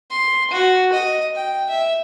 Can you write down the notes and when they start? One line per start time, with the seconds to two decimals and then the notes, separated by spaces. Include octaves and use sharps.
0.11 C6
0.51 F#4
0.93 D#5
1.35 G5
1.70 E5